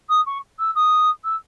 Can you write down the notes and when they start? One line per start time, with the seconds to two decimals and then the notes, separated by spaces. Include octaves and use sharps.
0.09 D#6
0.26 C#6
0.59 E6
0.75 D#6
1.24 E6